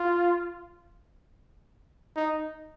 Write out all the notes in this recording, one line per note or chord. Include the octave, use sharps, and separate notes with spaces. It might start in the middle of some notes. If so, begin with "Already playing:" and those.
Already playing: F4
D#4